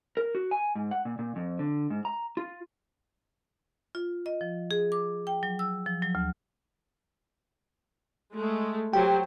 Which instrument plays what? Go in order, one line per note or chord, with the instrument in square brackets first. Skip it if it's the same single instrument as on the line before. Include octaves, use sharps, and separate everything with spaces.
[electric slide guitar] A#4
F#4
G#5
G#2
F#5
A#2
A#2
F2
D3
G#2
A#5
F4
[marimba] F4
D#5
F3
G#4
D6
G5
F#3
E6
F3
F#3
D2
[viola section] G#3 A3
[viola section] F#3 C5 [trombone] G4 [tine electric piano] G5